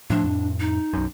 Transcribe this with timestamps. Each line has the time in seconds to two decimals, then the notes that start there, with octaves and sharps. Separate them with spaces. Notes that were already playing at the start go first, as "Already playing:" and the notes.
0.10 A2 F3 A3 D4
0.23 F2 A2
0.60 D#4
0.93 B1 F#2